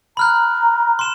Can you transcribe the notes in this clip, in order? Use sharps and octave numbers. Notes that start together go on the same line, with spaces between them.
A#5 B5 F6 F#6
C6 E7